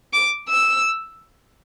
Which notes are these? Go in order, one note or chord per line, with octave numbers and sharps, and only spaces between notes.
D6
E6